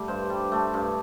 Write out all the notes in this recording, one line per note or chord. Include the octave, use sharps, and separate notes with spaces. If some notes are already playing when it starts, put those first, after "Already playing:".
Already playing: G3 A3
G2 C5
G3
A3
G2